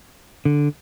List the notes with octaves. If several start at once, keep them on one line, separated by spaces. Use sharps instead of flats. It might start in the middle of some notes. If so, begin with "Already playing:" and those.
D3